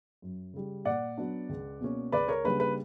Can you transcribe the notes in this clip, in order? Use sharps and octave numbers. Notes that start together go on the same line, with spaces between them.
F#2
C#3 G3
A#2 D5 F#5
F#3 B3 D4
C#2
B2 A#3 C#4
C#2 B4 D5
A#4 C#5
C#3 G3 A#3 D4 B4
B4